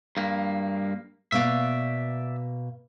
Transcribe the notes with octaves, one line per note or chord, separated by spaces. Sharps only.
G2 A#3
B2 A#3 D5 E5 F5